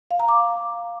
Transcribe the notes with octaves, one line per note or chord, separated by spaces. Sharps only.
F5
A#5
D6